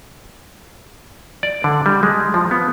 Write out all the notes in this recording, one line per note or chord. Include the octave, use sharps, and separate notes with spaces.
D5
D3
G3
G#3
F3
B3